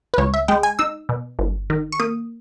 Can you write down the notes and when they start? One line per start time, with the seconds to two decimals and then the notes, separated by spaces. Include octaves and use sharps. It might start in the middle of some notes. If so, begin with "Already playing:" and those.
0.14 B4
0.18 C#2 C#5
0.34 E5
0.48 G#3 G5
0.63 G#5
0.79 D#4 E6
1.09 B2
1.39 G1
1.70 D#3
1.92 C#6
2.00 A#3 D#6